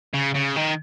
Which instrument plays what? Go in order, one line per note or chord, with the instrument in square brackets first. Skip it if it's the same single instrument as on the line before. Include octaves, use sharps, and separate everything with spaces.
[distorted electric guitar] C#3
C#3
D#3